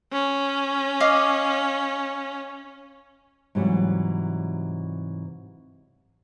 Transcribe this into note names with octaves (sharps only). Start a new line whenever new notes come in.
C#4
D#5 F5 D6
G#2 C3 E3 F#3 G3